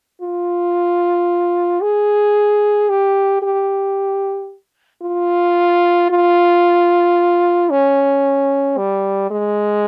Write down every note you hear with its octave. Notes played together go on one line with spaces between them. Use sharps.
F4
G#4
G4
G4
F4
F4
C#4
G3
G#3